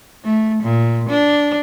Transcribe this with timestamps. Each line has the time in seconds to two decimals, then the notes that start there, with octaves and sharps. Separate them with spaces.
0.24 A3
0.63 A#2
1.09 D4